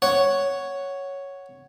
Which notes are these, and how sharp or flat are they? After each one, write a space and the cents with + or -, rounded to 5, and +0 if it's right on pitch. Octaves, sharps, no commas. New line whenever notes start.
C#5 +0 F#5 +5